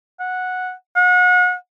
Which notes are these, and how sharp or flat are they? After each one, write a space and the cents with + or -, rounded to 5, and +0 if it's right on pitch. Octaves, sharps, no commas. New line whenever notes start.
F#5 -10
F#5 -35